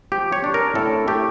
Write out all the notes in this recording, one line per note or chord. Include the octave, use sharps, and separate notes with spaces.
F3 G4
C#5
D4
A#4
A2 A4
A3 G4